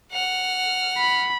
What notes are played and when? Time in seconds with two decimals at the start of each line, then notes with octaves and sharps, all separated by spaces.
0.12 F#5 F6
0.98 B5